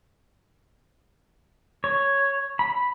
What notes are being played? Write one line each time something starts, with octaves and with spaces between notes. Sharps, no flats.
C#5
B5